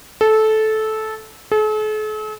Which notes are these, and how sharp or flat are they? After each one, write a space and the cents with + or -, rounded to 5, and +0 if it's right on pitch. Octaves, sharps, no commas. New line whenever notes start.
A4 -15
A4 -45